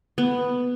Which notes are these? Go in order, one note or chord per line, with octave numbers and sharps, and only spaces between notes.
B3